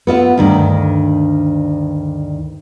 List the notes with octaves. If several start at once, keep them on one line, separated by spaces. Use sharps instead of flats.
B3 F4 D#5 E5
D2 G2 D#3